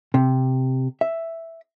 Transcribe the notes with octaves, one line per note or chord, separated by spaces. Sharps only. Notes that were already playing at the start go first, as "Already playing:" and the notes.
C3
E5